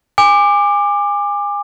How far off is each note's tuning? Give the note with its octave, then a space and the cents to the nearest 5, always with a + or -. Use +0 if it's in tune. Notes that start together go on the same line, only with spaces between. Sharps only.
G#5 -30 D6 +20